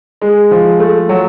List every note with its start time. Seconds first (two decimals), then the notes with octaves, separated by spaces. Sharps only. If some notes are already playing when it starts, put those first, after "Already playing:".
0.22 G#3
0.51 F3
0.80 A3
1.09 F#3